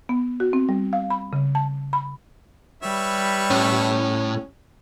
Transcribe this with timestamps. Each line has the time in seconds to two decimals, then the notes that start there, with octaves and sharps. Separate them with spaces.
0.09 B3
0.40 F#4
0.53 C4
0.69 G3
0.93 F5
1.10 B5
1.33 C#3
1.55 A5
1.93 B5
2.83 G3 B4 C#5 E5
3.51 A2 C#4